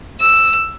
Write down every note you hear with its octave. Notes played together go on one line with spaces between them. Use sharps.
E6